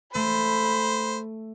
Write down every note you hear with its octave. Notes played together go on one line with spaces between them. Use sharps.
A3 C5 B5